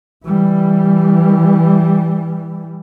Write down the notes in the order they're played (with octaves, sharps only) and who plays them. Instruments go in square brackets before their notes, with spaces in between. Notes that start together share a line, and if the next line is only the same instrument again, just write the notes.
[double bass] E3 G3